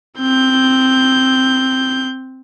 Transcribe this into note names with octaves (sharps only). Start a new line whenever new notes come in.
C4 G6